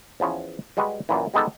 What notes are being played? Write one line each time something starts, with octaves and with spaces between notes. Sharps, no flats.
E2 F3 B3 C#4
G3 G#3 F#4 B4
F#2 A#2 E3
G3 G#3 B3 D#4 G4 A4